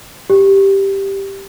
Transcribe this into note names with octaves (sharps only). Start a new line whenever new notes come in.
G4